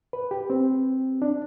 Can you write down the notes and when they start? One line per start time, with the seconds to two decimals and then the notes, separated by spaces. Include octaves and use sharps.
0.13 B4
0.31 G4
0.50 C4
1.22 D4